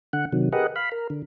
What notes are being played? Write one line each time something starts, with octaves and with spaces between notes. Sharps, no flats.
D3 F#5
C3 D#3 F#3
G4 G#4 A#4 B4 D#5 F#5
F5 B5
A#4
D3